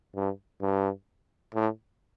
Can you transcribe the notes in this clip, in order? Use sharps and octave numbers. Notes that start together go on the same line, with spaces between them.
G2
G2
A2